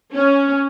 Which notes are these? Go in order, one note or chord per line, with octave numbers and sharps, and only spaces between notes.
C#4